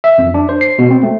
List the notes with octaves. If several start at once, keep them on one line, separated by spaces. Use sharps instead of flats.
E5
F2
D4
C5
C7
B2
C4
A3